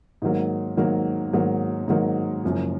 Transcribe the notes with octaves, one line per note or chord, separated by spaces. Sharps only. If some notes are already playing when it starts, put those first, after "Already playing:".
G#2 D#3 F#3 A#3
G#2 D#3 F#3 A#3
G#2 D#3 F#3 A#3
G#2 D#3 F#3 A#3
F#1 F#2 F3